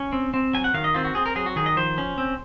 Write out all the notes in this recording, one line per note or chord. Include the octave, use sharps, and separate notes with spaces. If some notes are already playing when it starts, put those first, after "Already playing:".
Already playing: C#4 G#5
C4
C4
F#3 G#5
F#5
D#3 F5
D#5
C4 F4
F#4
C4 G#4
A#4
F#3 G#4
F#4
D#3 G#4
D#5
F3 C5
C#4
C4